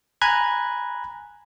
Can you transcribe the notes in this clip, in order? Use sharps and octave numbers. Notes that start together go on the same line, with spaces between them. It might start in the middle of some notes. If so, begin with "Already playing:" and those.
G#5 A#5 B5 F#6 G#6